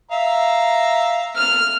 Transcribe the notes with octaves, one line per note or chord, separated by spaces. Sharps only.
E5 F5 A#5
F6